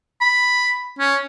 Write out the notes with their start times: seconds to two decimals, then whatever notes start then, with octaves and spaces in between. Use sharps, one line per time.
0.21 B5
0.99 C#4